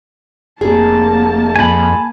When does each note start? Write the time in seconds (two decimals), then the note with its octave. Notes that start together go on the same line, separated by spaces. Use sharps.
0.61 F1 A#3 G#4 A5
1.56 F2 G#5 B5